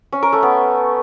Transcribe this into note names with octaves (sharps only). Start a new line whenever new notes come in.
C#4
A#4
A3
B3